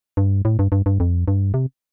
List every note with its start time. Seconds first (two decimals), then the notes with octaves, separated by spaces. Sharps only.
0.17 G2
0.45 A2
0.59 G2
0.72 G2
0.86 G2
1.00 F2
1.28 G2
1.54 C3